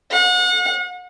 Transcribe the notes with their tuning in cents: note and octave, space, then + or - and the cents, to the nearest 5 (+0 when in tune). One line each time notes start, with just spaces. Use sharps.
F#5 -35